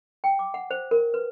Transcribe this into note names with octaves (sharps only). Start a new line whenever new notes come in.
G5
D6
F#5
C5
A#4
B4